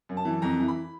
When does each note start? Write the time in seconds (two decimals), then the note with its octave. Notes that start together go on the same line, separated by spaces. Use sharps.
0.09 F#2
0.17 A5
0.25 E3
0.42 F2 A#5
0.60 E3
0.68 B5